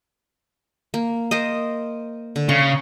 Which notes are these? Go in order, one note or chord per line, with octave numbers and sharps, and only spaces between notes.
A#3
A#4 C5 D#5
D3
C#3 C#6